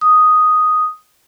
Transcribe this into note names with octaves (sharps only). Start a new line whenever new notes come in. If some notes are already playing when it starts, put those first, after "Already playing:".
D#6